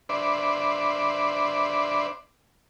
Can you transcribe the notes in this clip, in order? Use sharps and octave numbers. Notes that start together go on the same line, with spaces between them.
D4 B4 C5 D5 E5